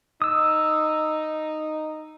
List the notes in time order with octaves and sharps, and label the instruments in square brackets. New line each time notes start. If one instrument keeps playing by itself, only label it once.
[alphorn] D#4 [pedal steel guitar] D#6 E6